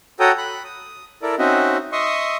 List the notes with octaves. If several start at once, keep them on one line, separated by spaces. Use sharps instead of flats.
F#4 A4 C#5 G5 A#5 D#6
B5 F#6
D#6
E4 A4 A#4 D5
C4 C#4 D#4 F#4 D#5 E5
D#5 E5 C6 C#6 D#6